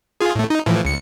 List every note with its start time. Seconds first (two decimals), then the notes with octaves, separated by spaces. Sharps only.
0.21 F4 G#4
0.35 A2 A3
0.50 D#4
0.66 A2 E3 F3
0.85 C#2 C#7